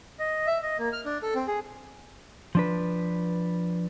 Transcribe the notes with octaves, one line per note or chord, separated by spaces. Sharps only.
D#5
E5
D#5
A#3
F6
D4
A4
C4
G#4
F3 D4 B4